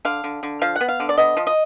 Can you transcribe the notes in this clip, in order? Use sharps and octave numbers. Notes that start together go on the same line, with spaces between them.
D3 F5
D3
D3
F3 F5
F#5
B3
F5
D3
D5
B3 D#5
F3
D#5